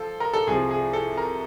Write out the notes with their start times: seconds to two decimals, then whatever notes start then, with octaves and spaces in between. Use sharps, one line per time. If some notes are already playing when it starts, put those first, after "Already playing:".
Already playing: F3 A4
0.20 A#4
0.33 A4
0.47 C2 C3 F3 G#4
0.70 G#4
0.93 A4
1.17 A#4